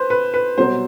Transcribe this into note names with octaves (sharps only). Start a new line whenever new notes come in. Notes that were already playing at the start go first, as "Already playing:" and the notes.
Already playing: B4 C5
B4
B4
C2 B2 F#3 C5